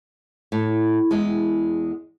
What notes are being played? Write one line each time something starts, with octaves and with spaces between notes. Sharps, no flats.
A2
E2 G#3